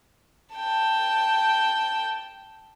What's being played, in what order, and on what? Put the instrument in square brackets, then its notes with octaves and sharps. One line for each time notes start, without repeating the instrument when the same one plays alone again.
[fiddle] G5 A5